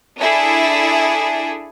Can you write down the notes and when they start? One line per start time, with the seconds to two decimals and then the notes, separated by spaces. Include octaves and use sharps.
0.17 D4 E4 G#4 A4